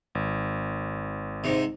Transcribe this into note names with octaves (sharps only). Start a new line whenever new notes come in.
G#1
G#2 C3